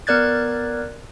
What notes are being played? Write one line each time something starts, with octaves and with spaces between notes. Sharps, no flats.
B3 A#4 D5 F#6 G#6 A6